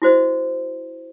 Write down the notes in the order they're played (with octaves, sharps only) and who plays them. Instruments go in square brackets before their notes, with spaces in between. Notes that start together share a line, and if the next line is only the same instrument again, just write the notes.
[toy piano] E4 F#4 C5 D#5